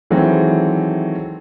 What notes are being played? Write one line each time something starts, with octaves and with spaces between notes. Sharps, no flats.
D#3 E3 F#3 G#3 A3 C4